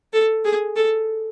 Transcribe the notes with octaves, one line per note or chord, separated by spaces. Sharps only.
A4
G#4
A4